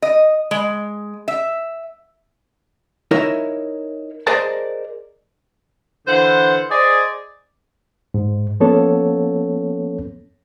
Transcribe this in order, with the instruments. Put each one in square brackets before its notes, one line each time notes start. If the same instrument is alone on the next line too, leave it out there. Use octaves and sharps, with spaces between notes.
[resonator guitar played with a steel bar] D#5
G#3
E5
[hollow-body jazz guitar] D#4 E4 A#4 C#5 E5
G#4 A#4 C5 D5 D#5 A5
[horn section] D3 E3 C5 F#5 C6
G#4 C5 D5 D#5
[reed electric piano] G#2
F3 A#3 B3 C#4 A4 C#5